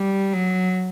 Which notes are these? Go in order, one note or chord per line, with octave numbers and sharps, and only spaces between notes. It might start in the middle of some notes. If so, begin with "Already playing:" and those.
Already playing: G3
F#3